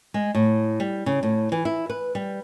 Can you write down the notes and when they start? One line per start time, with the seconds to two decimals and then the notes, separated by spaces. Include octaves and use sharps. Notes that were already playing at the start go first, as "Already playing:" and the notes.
0.14 G#3
0.35 A2
0.80 G3
1.06 C#3
1.23 A2
1.52 E3
1.65 E4
1.90 B4
2.15 G3